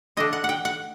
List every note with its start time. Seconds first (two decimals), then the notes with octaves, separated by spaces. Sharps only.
0.17 D3 A3 D4 D#5
0.33 F#5
0.44 F#5
0.49 G5
0.65 F#5